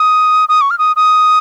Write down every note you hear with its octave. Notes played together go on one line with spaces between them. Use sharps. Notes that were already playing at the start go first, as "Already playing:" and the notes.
Already playing: D#6
D#6
C#6
F6
D#6
D#6